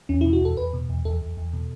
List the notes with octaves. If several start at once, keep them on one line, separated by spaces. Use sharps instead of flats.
E2 C#4
B2 E4
F#4
E2 A4
E2 B4
B2
E2
E2 A4
E2
E2
B2